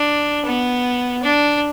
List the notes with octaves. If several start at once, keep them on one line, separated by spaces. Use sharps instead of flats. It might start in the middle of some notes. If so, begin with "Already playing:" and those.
Already playing: D4
B3
D4